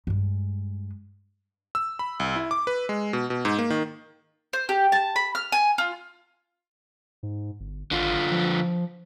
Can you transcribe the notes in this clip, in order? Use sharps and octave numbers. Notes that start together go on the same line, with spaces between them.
G2 G#3
E6
B5
C2
E4
D6
B4
G#3
B2
B2
G#2
A#3
D#3
C5
G4
A5
B5
F6
G#5
F4
G#2
G1
G#1 D3 F4
F3